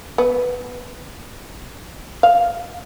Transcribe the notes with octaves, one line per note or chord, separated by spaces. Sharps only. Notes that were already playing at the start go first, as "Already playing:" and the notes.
B3
F5